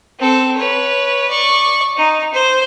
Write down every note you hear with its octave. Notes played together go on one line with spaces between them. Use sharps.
C4 A4
B4 C#5
D5 C#6
D#4
C5